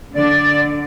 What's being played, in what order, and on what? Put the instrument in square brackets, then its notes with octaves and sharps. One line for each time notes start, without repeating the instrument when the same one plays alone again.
[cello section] D3 [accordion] D5